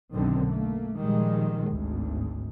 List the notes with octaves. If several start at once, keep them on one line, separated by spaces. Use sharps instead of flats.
B1 F#2 D3 D#3 C4
A3 A#3
A#2 D#3 F3 G3 G#3
G#1 D2 G#2